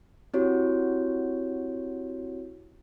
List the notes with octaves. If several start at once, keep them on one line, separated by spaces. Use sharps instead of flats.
C4 E4 F#4 G4 C#5